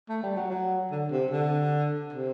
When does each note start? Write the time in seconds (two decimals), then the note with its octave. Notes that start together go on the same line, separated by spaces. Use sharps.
0.09 A3
0.23 G3
0.37 F#3
0.50 F#3
0.91 D3
1.11 C3
1.31 D3
2.13 C3